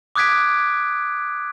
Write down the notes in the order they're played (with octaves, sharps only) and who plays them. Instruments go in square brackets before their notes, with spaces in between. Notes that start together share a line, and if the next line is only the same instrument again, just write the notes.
[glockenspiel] D6 D#6 F#6 G#6 B6 D7